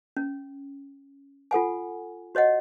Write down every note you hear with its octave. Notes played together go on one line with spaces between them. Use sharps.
C#4
F4 A4 F#5 G#5
F#4 C#5 D#5 F#5